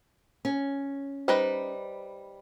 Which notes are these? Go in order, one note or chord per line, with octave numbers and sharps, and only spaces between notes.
C#4
G3 D#4 B4 C5